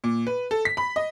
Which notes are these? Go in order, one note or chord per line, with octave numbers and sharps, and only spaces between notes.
A#2
B4
A4
B6
B5
D#5